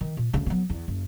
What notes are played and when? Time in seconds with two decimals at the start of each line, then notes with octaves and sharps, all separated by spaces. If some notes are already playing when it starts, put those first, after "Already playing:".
0.01 D#3
0.17 A#2
0.33 D2 C#3
0.46 F#3 B3
0.70 E2
0.88 F#1